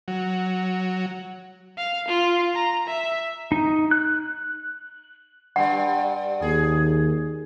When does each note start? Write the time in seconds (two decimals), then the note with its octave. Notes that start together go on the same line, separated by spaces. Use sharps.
0.08 F#3
1.78 F5
2.09 F4
2.55 A#5
2.88 E5
3.52 D#4
3.91 F#6
5.56 G2 G3 F#5
6.42 D#2 G#4